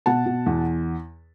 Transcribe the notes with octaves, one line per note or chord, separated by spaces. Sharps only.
B2 F#5 A5
B2
E2